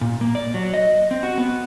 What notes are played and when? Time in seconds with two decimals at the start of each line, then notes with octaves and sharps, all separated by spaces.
0.01 A#2
0.21 A#3
0.35 D5
0.54 F#3
0.74 D#5
1.11 C4
1.23 F#4
1.38 B3